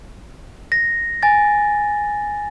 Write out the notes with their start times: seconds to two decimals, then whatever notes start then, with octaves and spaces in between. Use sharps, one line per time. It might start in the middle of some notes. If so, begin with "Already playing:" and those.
0.72 A#6
1.23 G#5 A6